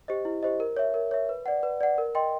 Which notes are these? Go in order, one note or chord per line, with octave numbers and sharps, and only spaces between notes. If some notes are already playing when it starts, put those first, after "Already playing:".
G4 C5 D#5
E4
G4 C5 D#5
A#4
C#5 E5
A#4
C#5 E5
B4
D5 F#5
B4
D5 F#5
A#4
D#5 G5 C6